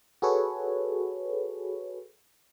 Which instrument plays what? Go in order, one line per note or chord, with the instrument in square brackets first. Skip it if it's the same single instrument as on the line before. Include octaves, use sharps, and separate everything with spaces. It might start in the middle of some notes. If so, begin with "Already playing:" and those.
[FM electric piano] F#4 G#4 A4 B4 C#5